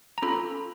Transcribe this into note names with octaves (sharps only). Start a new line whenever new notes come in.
A#5
C#4 F4 A4 B5